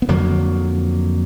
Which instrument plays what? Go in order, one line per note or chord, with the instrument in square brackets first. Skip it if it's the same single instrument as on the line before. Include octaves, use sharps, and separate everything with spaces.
[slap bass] B3
F2 D3 F#3 A#3